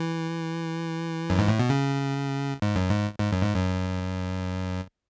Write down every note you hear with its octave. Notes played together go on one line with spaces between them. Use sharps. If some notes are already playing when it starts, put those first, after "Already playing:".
Already playing: E3
F#2
G#2
A2
B2
C#3
G#2
F#2
G#2
G#2
F#2
G#2
F#2